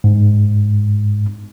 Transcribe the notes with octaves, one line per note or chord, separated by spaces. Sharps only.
G#2